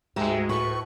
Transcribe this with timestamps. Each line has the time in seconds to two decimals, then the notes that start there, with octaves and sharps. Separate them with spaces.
0.16 D2 G#2 G#3 G4 A#4 E5
0.49 A2 B4 C#6